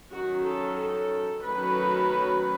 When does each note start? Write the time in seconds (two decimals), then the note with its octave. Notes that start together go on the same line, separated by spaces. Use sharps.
0.11 D#3 F#3 C#4 F#4
0.44 A4
0.77 A4
1.44 D#3 F#3 A3 C#4 B4